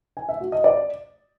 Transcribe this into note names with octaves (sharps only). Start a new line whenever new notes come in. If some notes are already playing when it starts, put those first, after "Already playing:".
G#5
E5
F#4
D#5
D5